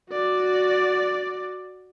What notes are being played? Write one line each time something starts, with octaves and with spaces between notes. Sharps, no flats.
F#4 D5